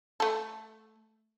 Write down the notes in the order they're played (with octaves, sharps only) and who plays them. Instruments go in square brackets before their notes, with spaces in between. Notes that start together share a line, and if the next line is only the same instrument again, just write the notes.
[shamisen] A3 A4